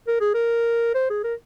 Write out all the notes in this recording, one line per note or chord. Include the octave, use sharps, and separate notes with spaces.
A#4
G#4
A#4
C5
G#4
A#4